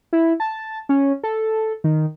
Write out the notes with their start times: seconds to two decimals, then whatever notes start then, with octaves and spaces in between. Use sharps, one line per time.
0.13 E4
0.40 A5
0.89 C#4
1.24 A4
1.84 D#3